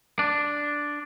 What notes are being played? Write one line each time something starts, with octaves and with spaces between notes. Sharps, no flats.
D4